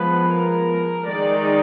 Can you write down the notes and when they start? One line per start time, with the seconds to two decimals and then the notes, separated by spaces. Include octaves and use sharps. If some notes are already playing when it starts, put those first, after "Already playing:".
Already playing: F3 G#3 B3 B4
0.26 A#4
1.07 D#3 G#3 D#4 D5